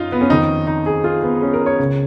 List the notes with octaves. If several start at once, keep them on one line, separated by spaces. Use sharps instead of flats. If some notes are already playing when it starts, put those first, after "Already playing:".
Already playing: F#2 D#4 F4
B3
C#4
F2 D#3 D#4
D#4
G#4
F4
B3
C#4
A#4
C#5
C#2 C#3